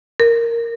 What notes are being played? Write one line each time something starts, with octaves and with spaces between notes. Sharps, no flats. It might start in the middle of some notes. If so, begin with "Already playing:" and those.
A#4